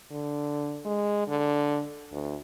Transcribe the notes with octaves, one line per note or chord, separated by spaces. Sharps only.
D3
G#3
D3
D2